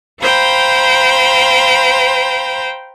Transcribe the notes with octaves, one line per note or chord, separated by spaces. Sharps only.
C5 F5 G5 A#5 B5